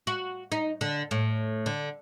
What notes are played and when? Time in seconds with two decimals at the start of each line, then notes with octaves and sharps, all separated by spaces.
0.07 F#4
0.52 D#4
0.81 D3
1.11 A2
1.66 D3